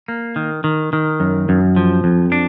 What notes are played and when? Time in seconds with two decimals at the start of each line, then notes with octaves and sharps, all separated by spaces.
0.08 A#3
0.36 D#3
0.64 D#3
0.93 D#3
1.20 F#2
1.49 F#2
1.76 F3
2.04 F2
2.32 D4